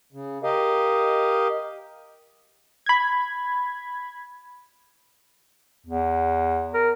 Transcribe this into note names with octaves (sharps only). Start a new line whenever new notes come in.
C#3
G4 A#4 D#5 F5
B5 G#6
E2
A#4